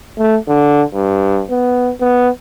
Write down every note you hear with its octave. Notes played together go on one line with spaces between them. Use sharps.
A3
D3
G2
B3
B3